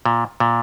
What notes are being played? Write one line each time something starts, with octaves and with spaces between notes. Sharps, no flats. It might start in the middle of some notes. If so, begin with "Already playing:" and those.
A#2
A#2